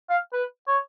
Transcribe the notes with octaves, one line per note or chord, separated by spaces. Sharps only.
F5
B4
C#5